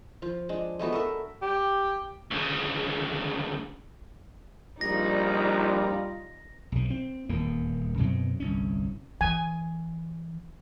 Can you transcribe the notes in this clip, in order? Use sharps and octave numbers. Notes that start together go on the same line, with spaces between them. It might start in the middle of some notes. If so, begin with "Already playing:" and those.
F3 F4
G#3 D4
G#3 A3 B3 F#4
A4 A#4 E5
G4
D2 C#3
A#1 G3 D#4 F4 D5 A#5 A#6
B1 C3
C4
D#1 E2 A#3
F#2 B2 F#3 C4
G1 C2 C#4
E3 G#5